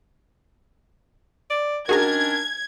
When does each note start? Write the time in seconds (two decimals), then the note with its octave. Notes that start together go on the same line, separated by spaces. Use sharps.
1.50 D5
1.89 D#3 C#4 D4 F#4 G#4 A#4 A#5 G#6